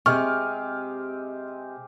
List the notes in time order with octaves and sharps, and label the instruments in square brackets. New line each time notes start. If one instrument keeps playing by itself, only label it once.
[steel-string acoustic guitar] C3 [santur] G#3 C4 G4 [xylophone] C#6 [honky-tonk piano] F6